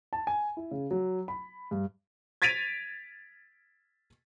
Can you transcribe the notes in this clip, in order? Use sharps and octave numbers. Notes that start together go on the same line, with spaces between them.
A5
G#5
E4
C#3
F#3
B5
G2
G#6 A6 B6 D7 D#7 F7